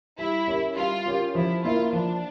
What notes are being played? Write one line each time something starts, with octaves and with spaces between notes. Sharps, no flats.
G3 E4
C#4 G4 A#4 C#5
G3 F4
C#4 G4 A#4 C#5
F3 E4
A#3 E4 F4 A#4
F3 D4